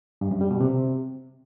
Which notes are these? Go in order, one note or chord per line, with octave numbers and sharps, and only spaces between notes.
G2
F#2
G3
B2
C3